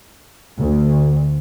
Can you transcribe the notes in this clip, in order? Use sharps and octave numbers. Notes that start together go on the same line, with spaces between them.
D2